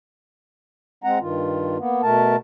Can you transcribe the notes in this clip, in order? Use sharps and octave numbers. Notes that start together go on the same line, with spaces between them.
G#3 C4 F#5 A#5
G2 D#3 F4
A#3 B3
B2 A3 A#4 A5